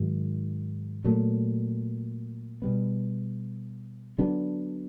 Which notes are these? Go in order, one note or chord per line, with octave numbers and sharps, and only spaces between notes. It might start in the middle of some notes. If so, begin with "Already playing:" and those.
Already playing: G#2 D#3 F#3
A#2 F#3 A3
B2 G3 B3
D3 F#3 B3 D4